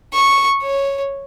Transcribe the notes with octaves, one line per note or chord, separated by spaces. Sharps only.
C#6
C#5